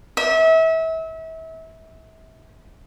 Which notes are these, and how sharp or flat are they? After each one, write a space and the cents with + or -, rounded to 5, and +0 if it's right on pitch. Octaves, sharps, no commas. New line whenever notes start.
E5 -30